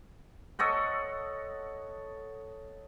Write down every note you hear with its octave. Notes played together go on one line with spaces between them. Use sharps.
A4 C#5 D#5 F#5